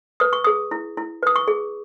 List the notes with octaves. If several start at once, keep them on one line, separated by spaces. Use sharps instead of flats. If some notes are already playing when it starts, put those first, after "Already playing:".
B4 D#6
C#6
G#4 D#6
E4
E4
B4 D#6
C#6
G#4